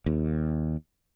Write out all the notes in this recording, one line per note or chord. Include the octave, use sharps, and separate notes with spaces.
D#2